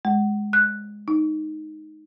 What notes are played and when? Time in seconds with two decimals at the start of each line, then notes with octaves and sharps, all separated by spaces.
0.05 G#3
0.53 F#6
1.08 D#4